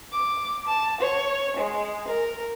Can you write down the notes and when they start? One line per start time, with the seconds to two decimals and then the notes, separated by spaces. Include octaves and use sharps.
0.12 D6
0.66 A5
1.01 C#5
1.57 G#3
2.08 A#4